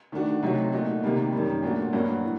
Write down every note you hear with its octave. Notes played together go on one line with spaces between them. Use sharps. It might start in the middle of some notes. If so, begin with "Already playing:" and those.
D#3 A3 D4 F#4
C3 F#3 A3 D#4 F#4
A#2 A3 D#4 F#4
C3 D#3 G3 A#3
F#2 D#3 G3
A#2 A3 D4 F#4
G2 F#3 A#3 F#4
A2